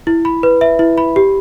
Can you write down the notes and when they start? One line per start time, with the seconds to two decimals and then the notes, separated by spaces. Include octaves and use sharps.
0.07 E4
0.25 B5
0.43 B4
0.61 E5
0.79 E4
0.98 B5
1.16 G4